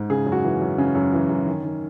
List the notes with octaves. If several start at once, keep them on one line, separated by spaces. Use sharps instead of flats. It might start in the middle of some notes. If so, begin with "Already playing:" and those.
Already playing: G#2
C#3 G#4
F#2
F#4
E3
F#2
C#3 C#4
F#2
E3
F#2
D#3
D#3